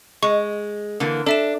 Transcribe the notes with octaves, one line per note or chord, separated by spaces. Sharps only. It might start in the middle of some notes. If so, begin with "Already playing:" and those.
G#3 C#6
D3 E3 A#3
D4 A4 E5 E7